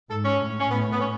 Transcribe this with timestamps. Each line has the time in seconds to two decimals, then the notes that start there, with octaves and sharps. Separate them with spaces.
0.09 G#2 A4
0.24 C#4
0.41 A2
0.60 C#4
0.70 A2 B3
0.92 B3
1.00 C#4